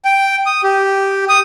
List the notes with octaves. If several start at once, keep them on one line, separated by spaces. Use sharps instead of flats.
G5
D#6
G4
D#6